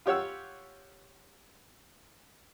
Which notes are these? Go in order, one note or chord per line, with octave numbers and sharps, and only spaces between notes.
F4 G4 C#5 F#5 E6